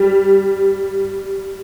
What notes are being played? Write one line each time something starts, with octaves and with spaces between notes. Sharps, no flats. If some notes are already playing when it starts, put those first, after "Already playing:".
Already playing: G3